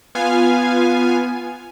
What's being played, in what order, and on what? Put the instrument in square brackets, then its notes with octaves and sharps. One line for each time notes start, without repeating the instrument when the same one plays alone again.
[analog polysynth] B3 F4 F5 G#5